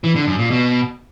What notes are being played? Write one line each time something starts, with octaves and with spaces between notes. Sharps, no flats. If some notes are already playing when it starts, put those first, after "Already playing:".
E3
D3
F#2
A#2
B2